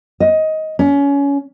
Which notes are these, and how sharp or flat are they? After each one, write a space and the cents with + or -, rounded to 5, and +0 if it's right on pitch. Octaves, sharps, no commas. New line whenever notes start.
D#5 +15
C#4 +25